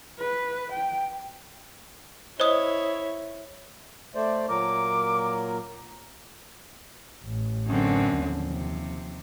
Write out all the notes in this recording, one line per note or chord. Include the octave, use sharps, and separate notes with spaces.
B4
G5
E4 C5 C#5 D#5 D#6
A3 C5 D5
A#2 F#3 A#4 D6
A1
F#2 D3 C4
D#2 F3
C3